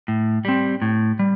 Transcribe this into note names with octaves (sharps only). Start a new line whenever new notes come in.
A2
G3 C4
A2
G3